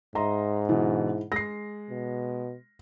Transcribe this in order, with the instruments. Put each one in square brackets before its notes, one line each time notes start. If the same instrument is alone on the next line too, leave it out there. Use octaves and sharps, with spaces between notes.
[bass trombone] G#2 [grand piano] D#5 E5 C6 [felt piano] A#5
[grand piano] B2 D3 E3 [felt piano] E4
[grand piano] G#3 [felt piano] A#6 C7
[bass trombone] B2